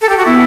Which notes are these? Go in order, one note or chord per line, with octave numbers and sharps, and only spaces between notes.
A4
G4
F#4
B3 E4